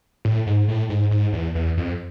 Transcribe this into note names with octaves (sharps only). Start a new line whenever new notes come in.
A2
G#2
A2
G#2
G#2
E2
E2
F2